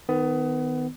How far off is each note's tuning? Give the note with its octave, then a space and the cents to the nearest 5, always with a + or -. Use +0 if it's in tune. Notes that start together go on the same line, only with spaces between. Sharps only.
D#3 +0 B3 +25